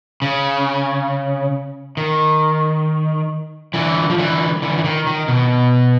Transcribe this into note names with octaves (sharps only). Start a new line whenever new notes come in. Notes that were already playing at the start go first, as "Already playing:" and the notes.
C#3
D#3
D3 E3
F3
D3 E3
D3 E3
E3
D#3
D#3
B2